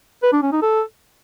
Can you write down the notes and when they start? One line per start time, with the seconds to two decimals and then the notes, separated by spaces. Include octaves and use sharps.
0.23 B4
0.33 D4
0.42 C#4
0.52 D#4
0.62 A4